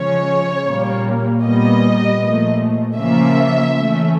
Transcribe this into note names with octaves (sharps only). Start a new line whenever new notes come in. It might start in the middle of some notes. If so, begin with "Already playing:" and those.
Already playing: C#3 F3 G#3 C#4 C#5
A#2 G3 A#3
A#2 G3 B3 D#5
A#2 F3 A3
C#3 F3 A#3 C#4 E5
E3 A3 C#4